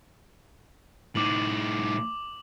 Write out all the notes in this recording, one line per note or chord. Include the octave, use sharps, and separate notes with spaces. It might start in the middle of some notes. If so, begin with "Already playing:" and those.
A2 D#4 D6 F#7